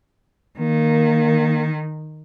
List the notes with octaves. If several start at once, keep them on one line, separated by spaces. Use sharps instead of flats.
D#3 A#3